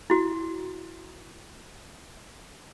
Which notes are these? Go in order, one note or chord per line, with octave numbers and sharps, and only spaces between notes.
E4 F#4